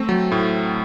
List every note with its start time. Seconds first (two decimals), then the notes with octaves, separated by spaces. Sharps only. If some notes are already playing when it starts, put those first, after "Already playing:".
Already playing: A3 C4
0.09 F#3
0.32 A2